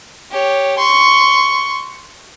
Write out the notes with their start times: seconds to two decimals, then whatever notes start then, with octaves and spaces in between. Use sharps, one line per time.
0.31 G4 C#5
0.78 C6 C#6